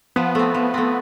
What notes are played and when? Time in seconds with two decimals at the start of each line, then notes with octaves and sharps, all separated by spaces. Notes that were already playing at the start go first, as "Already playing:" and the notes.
0.16 F3 B3
0.35 A3 C4
0.54 F3
0.74 A3 C4